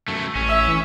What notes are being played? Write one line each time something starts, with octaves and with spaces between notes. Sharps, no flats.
F#2 A3
A1 C#4
E5
E3